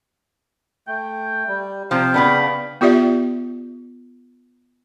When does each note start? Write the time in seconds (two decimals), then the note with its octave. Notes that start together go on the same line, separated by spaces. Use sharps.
0.88 A3 G5
1.48 G3
1.91 C3 F3 C5 F5 G5
2.14 C#3 B3 D4 B5
2.81 B3 F4 G4 D5 E5